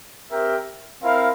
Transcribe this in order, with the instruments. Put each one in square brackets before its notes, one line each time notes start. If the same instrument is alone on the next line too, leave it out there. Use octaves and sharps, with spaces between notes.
[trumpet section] C4 G4 A#4 E5 G5
C4 E4 A#4 F5